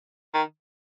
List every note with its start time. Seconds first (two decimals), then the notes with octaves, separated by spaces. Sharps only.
0.34 D#3